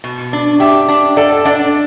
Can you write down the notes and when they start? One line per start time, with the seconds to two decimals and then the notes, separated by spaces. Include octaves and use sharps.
0.04 B2
0.33 D4
0.60 G4 E5
0.88 D4
1.17 A4 D5
1.45 D4 D5